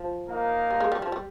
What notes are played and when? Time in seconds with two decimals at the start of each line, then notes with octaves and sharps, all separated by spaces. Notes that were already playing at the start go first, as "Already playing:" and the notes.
Already playing: F3
0.29 A#3 D#4 A#4 F5
0.71 G3
0.80 G#3
0.92 G3
1.02 F3
1.12 G3